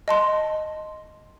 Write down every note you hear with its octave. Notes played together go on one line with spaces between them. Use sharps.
D#5 A5 C6